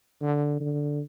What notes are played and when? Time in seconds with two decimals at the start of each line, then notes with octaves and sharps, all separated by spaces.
0.22 D3
0.60 D3